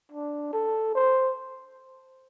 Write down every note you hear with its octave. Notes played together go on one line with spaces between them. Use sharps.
D4
A4
C5